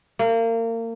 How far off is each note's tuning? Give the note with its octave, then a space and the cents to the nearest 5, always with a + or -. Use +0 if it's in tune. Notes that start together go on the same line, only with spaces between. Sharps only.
A#3 -30